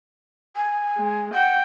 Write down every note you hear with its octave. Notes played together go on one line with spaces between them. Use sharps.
G#5
G#3
F#5 G5